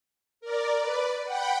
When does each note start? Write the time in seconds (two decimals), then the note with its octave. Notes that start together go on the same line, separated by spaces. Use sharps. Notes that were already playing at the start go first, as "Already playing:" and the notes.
0.41 A#4 D5
0.76 B4 D5
1.24 F#5 G5 B5